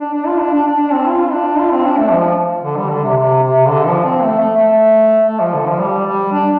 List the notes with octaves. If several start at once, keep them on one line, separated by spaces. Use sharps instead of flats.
D4
D4
F4
D4
D4
D4
D4
C4
F4
D4
F4
C4
D4
A3
F3
D3
G3
D3
C3
C3
C3
D3
F3
C4
A3
A3
A3
A3
F3
D3
F3
G3
G3
D4